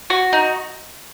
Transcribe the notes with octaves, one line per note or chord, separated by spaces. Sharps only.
F#4
D#4